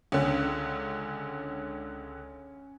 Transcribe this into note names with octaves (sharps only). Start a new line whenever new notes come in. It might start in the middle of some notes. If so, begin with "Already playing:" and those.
C#2 D3 C#4